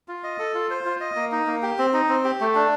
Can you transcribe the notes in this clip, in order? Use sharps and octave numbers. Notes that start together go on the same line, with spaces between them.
F4
D#5
A4
F4
C5
F4
D#5
A#3
D#4
A#3
G4
C4
D#4
C4
G4
A3
D4